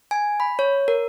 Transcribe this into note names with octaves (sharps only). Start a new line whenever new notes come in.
G#5
B5
C#5
A#4